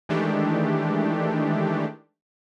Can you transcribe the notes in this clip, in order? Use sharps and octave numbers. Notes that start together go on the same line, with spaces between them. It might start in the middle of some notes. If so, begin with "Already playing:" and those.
D#3 E3 G#3 A3 D4 G4